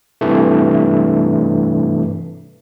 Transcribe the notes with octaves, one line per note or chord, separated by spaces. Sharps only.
G2 C3 E3 A3